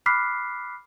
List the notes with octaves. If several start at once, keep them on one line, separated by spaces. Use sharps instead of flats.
B5 D6 F6 F#6 B6 C7